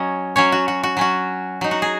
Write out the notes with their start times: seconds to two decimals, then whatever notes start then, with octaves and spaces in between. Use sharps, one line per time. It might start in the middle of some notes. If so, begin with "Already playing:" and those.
Already playing: F#3 C#4 D#5
0.36 F#3 C#4 C#5
0.52 F#4
0.68 F#4
0.83 F#4
0.97 F#3 C#4 F#4
1.61 F#3 D#4
1.71 F#4
1.82 G#4